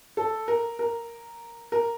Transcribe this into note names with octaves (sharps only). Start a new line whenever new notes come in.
A4
A#4
A#4
A#4